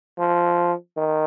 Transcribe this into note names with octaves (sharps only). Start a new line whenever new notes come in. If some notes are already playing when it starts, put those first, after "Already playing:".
F3
D#3